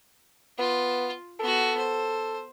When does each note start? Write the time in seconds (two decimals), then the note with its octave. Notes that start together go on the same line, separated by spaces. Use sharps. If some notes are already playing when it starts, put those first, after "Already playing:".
0.59 B3 F4
1.40 B3 F#4 A4
1.78 C5